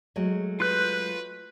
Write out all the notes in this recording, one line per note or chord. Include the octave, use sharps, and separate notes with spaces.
F#3 G#3 A3
F4 B4 F#6 G6